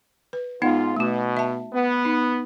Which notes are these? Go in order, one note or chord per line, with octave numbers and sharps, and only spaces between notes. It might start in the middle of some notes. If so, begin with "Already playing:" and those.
B4
G#2 B3 D#4 F4 F#5
B2 A3 F#4
E5 A5
B3
D#4